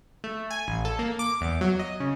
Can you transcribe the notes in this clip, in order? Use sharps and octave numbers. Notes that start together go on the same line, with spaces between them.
A3
G#5
A1
A4
A#3
D6
E2
F#3
D#5
C#3